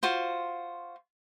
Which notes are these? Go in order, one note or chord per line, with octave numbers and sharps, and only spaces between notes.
F4 F#4 C5